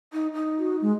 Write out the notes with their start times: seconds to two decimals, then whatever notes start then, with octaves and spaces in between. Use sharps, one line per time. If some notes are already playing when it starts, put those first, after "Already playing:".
0.13 D#4
0.34 D#4
0.59 F#4
0.82 G#3